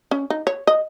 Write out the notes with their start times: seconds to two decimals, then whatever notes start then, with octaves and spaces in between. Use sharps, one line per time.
0.11 C#4
0.30 D#4
0.47 C#5
0.67 D#5